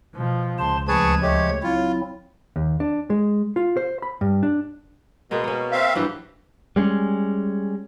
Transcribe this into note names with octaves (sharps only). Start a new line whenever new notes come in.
B2 F3
C#2 C5 A5 C6
D2 F3 G#4 B4 A5 C#6 G#6
G#3 A3 G4 C#5
F#3 C4 E4 F4
D#2
D4
G#3
F4
C5
B5
G2
D4
B2 G#3 A#3 B3
A#3 C#4
C4 E5 F5
G2 E3 F#3 G4
G3 G#3 C4 C#4